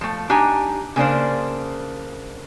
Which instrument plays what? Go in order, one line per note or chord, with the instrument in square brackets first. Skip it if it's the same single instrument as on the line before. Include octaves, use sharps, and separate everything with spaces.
[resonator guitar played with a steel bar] F3 A3
D4 D#4 G4 G#5
C#3 A#3 D4 C5